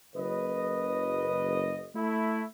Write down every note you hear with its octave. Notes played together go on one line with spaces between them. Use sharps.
F#1 B4 D#5
A3 E4